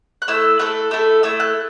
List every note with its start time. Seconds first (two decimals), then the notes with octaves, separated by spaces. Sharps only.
0.22 F#6
0.28 A3 E4 A4 E6
0.59 A3 E4 A4 F#6
0.91 A3 E4 A4
1.23 A3 E4 A4 E6
1.40 F#6